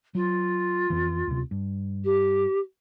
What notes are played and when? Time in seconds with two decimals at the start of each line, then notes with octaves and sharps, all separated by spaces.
0.15 F#3 F4
0.90 F2 E3
1.27 D2 C3
1.51 G2
2.04 G4